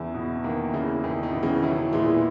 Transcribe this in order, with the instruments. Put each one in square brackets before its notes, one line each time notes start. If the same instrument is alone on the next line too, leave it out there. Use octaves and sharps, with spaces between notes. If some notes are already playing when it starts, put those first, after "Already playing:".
Already playing: [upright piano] E2 E4 [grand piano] C#3
[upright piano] B2
[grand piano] D#3 [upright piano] A#3
[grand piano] C#3 [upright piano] E4
[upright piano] E2 [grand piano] D#3
[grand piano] D#3
[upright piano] B2
[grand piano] C#3 E3
[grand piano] D#3 F#3 [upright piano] E4
[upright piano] A#2 [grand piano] E3 G#3